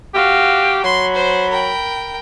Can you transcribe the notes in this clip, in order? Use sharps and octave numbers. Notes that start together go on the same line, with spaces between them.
F#4 G4 F5
F#3 B5 C6
C5
A#4 G5